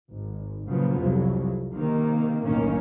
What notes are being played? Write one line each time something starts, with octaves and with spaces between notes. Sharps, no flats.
G#1
A#2 C#3 F3 F#3 B3
C2 F2 F#3
C3 D#3 A#3
F#1 B1 A2 D#3 A#3 C#4